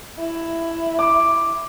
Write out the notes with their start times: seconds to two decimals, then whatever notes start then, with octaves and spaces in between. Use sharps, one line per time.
0.19 E4
0.99 D6